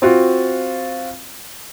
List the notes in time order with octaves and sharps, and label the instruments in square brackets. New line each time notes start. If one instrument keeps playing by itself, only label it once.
[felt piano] C4 F4 F#4